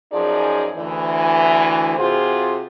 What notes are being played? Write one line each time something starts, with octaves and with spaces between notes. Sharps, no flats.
F#2 F3 D#4 G#4 D5
D2 E3
C3 F4 F#4 G#4 C5